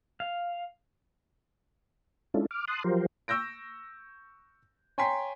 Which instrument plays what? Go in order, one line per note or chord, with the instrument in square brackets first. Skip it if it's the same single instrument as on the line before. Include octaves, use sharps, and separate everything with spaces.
[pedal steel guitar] F5
[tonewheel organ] G#3 C#4 D4 E4 F4 A4
D6 F6
A5 C6 D#6 F#6
F3 F#3 F4 G4 A#4 C5
[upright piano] C#6 E6 G6 A#6 D7
C#5 G5 G#5 A#5 C6 B6